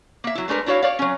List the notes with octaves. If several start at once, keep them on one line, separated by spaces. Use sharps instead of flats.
A#3 E5
F#3 E4
G#3 A3 D4 A#4 B4
D4 E4 F#4 C#5 F5
C#5 D5 F5
F#3 C#4